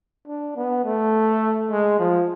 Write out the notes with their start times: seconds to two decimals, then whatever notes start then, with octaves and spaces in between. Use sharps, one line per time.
0.27 D4
0.56 B3
0.85 A3
1.71 G#3
1.99 F3